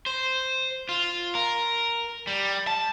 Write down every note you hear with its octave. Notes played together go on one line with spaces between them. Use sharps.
C5
F4
A#4
G3
A5